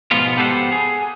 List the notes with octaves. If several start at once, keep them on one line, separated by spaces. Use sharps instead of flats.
G#2 B2 F3 B3 F4
B3 G4 A4 C5 E5 F#5
G#4